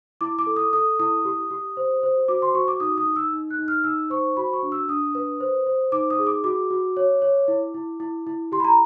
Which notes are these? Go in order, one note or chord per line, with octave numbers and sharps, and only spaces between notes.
E4 D6
D6
A4
D#6
A4 D#6
E4 D#6
G4
G4
C5
C5
F#4 D6
C6
F#4 C#6
D6
D#4 D#6
D#6
D#4
E6
D#4
F#6
D#4
F6
D#4 E6
C5 C#6
F#4 B5
C#6
D4
E6
D4 D#6
B4
C5
C5
D#4 D6
D#6
G#4
D6
F#4 D6
F#4
C#5
C#5
E4
E4
E4
E4
G4 C6
B5
A#5